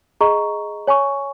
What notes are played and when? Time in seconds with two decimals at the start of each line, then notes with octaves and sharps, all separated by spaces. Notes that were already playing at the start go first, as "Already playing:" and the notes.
0.21 G#4 D#5 A#5 C#6
0.87 C#5 G#5 C#6